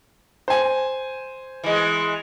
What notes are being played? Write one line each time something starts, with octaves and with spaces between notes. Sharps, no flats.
C5 G#5
E3 G#3